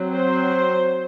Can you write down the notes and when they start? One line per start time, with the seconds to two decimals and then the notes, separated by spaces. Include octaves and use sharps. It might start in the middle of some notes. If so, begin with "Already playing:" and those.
Already playing: F#3 C4
0.15 C5